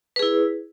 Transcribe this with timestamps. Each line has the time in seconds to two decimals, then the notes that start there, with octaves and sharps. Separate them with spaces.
0.16 B4
0.19 G#4
0.22 E4